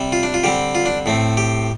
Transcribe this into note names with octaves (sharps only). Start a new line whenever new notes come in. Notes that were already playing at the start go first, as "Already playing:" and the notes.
Already playing: C3 G3
F4
D4
F4
D3 G3 C4 G4
F4
D4
A2 A3 C4
G4